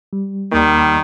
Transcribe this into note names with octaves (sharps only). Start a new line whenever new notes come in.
G3
D#2 D#3 G3 A#3